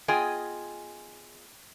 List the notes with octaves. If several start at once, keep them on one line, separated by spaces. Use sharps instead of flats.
B3 F4 G#4 D#5 G5 G#5